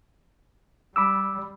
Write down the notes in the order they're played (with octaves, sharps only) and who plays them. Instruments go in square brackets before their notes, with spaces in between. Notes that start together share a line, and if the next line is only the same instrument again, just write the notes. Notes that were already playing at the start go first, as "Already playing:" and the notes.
[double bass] G3 [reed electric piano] B5 D6 E6